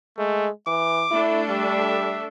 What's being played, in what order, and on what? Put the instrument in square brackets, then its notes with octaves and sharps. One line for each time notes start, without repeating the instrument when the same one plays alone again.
[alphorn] G#3 [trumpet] A3
[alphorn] E3 [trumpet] D6
[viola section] A3 D4 A4 [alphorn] E4
[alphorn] G3 [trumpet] E5